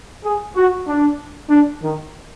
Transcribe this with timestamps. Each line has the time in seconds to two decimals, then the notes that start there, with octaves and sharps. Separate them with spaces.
0.24 G#4
0.56 F#4
0.88 D4
1.50 D4
1.83 D#3